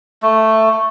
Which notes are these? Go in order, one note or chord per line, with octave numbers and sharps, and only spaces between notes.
A3